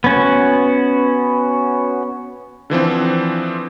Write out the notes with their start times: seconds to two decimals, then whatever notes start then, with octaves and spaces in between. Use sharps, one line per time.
0.04 B3 C#4 F#4
2.70 D3 E3 F3 C4